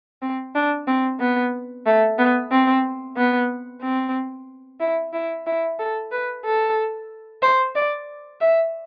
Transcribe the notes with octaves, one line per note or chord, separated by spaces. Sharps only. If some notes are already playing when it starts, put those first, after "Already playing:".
C4
D4
C4
B3
A3
B3
C4
B3
C4
E4
E4
E4
A4
B4
A4
C5
D5
E5